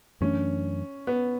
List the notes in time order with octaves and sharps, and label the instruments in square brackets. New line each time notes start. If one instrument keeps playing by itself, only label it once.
[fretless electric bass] F#2 E3 A3 D4 [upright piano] C#4
[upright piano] B3